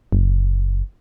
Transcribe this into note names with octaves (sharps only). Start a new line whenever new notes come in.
F#1